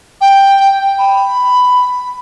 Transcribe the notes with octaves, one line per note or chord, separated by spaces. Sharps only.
G5
B5